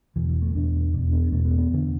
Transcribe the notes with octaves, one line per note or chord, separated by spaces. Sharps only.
E2 B2 E3
E3
A3
E2 B2 D4
E2 B2 D4
B3
E2 B2 A3
B3
B3
E2 D3